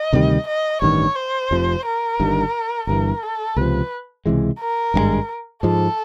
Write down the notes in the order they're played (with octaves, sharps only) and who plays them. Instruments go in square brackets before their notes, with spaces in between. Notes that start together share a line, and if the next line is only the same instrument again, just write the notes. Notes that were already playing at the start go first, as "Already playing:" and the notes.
Already playing: [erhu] D#5
[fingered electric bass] D2 C3 D#3 G3
[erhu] D#5
[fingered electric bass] A1 G2 D#3 [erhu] C#5
[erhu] C5
[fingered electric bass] F1 F2 C3 F3
[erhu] A#4
[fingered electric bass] G1 G2 D#3 G3
[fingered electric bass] G1 G2 E3 [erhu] A#4
[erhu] A4
[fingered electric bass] C#2 C3 F3 [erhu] B4
[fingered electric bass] C#2 C3 E3 G#3
[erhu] A#4
[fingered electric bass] G#1 G2 D#3 G#3
[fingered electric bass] G#2 F3 G#3 [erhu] A4